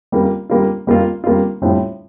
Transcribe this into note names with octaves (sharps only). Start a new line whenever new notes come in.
G3 A#3 F4
G3 A#3 F4
G3 A#3 F4
G3 A#3 F4
A2 G3 C4 F4